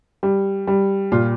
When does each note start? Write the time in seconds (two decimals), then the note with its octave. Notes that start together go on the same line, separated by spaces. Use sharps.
0.23 G3
0.67 G3
1.12 A#2 F4